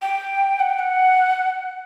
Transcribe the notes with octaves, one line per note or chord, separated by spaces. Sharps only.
G5
F#5
G5
F#5